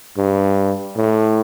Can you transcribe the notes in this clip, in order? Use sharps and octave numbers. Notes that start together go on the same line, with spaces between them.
G2
A2